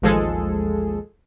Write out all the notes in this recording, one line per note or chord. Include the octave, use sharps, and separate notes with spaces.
A1 D#2 F3 G#3 G#4 A4